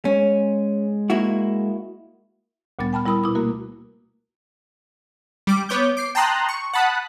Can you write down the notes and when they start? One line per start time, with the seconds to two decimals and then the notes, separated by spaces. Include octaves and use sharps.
0.05 G#3 C#4
1.10 A#3 E4 F#4
2.79 D2 A#2 G3 B3 A6
2.93 G5 A5 B5 F6
3.06 G3 E4 A#4 B5 D#6 E6
3.24 B2 E4 D6 D#6
3.35 A3 A#3 F#4 A#4
5.47 G3 D6
5.69 B3 C#5 D6 G6
5.97 D6 C7
6.15 G5 A5 A#5 C6 D#6 F#6
6.49 C#6
6.73 F#5 A5 B5 D#6 F#6